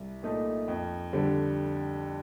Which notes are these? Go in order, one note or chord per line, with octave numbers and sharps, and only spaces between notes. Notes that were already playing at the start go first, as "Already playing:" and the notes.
Already playing: C2
A#2 A3 D#4
F2
D3 G3